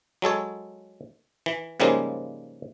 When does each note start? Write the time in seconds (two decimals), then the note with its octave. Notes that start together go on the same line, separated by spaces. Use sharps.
0.22 F#3 G#3 A4 C#5
1.46 E3
1.80 G#2 C#3 F3 G3 G#3 A#3